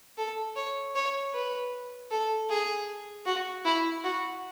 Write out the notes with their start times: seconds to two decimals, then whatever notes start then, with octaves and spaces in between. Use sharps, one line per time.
0.17 A4
0.56 C#5
0.95 C#5
1.33 B4
2.11 A4
2.50 G#4
3.26 F#4
3.65 E4
4.04 F#4